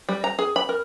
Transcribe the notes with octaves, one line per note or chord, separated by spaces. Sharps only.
G3
A#5
G#4
B5
A#4